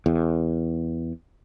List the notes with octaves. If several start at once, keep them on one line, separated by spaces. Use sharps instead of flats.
E2